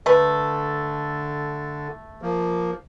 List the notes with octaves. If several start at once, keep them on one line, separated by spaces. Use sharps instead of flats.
D3 A3 B4
F3 A#3